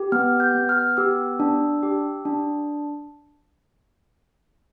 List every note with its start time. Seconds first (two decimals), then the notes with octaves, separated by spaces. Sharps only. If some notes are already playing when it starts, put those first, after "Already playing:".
Already playing: G4
0.12 B3 F6
0.40 G6
0.55 B3
0.69 F6
0.97 G4 E6
1.40 D4
1.83 G4
2.25 D4